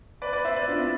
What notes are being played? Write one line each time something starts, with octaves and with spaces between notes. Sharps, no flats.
B4 D5
B4 D5
C5 E5
B4 D5
D4 F4
C4 E4